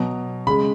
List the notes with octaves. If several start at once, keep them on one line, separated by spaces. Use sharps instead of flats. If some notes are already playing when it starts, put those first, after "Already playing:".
Already playing: B2 F#3
C#3 G#3 B5